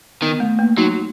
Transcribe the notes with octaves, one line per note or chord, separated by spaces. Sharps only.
D#3 B3
A3
A#3
F#3 D#4